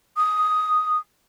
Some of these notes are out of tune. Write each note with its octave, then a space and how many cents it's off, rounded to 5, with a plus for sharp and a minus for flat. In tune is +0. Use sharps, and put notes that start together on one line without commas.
D#6 +5